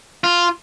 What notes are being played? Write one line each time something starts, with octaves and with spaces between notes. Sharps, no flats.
F4